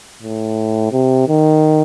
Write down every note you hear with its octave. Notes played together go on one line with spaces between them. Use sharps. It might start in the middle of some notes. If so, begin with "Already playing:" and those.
A2
C3
D#3